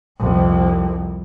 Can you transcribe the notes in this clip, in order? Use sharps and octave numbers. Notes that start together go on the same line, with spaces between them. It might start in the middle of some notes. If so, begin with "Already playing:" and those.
C2 F2